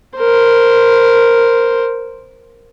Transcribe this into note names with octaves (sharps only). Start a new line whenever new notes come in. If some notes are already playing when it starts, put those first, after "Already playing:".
A#4 C5